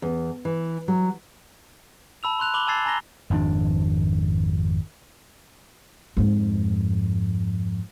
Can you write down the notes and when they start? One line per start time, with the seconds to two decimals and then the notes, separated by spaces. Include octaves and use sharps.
0.02 E2
0.45 E3
0.88 F#3
2.23 A5 B5 E6 F7
2.39 C6 E6 F#6 F7
2.54 B5 D6 F#7 G7
2.67 G#5 A5 E6 G#6 A6 C7
2.85 G#5 A#5 E6 G#6 A#6 G7
3.30 G#1 F2 C#4 D4
6.17 F2 G#2